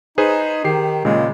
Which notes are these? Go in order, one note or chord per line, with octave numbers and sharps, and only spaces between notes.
D#4 G#4 B4 C5
D#3 G4 C7
A#2 C#3 G#3